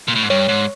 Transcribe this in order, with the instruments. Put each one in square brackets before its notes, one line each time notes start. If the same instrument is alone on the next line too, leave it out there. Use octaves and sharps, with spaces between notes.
[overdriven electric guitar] A#2
A2
G#2
[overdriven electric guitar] G2 [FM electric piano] C#5
[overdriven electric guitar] G#2